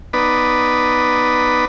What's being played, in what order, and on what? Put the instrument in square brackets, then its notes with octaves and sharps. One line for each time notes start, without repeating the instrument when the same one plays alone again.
[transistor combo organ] B3 D#4 B4 D5